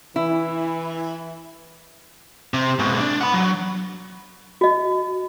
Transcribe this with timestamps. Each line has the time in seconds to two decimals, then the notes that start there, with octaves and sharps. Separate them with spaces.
0.16 E3 E4
2.54 C3
2.79 G#2 B2
3.00 D4
3.21 F#5 B5
3.34 F#3
4.61 F#4 D#5